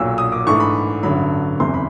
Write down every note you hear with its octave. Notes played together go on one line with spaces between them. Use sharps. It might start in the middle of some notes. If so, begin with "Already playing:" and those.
Already playing: B1 A#2 F#3 E6
D#6
D6
G#2 E3 A3 D4 C#6
B5
A1 G2 D3 F#3 B5
F#1 E2 C3 C6
B5